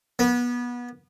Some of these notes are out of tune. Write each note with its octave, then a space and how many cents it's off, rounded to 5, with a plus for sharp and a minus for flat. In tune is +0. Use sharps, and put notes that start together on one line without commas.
B3 -25